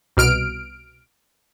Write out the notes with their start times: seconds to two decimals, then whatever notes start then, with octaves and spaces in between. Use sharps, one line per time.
0.17 C2 B2 F6 D7